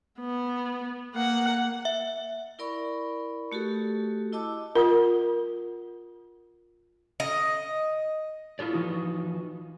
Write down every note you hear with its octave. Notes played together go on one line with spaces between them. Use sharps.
B3
A#3 F#5
E5
E4 A#4 D5 B5 C#6
A3 F#4 G4 A4
E4 D#5 A5 D6 E6
F4 A#4 F#5 D#6
D#5
E4 F4 A4 D5
E3 F3 D#4 F#4